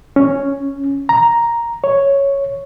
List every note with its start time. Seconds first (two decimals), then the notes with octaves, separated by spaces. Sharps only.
0.16 C#4
1.09 A#5
1.84 C#5